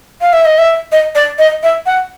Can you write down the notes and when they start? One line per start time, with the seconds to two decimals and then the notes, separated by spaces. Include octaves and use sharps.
0.21 F5
0.33 E5
0.45 D#5
0.58 E5
0.92 D#5
1.15 D5
1.39 D#5
1.63 E5
1.86 F#5